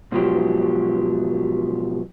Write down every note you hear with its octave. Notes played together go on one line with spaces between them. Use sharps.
G#2 B2 F3 F#3 G4